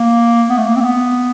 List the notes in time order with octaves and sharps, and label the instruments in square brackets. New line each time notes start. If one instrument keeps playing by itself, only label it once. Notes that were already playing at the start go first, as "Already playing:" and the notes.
Already playing: [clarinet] A#3
B3
A3
A#3
C4
A#3
B3